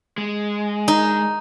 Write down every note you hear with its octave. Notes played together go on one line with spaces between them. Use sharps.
G#3
D#4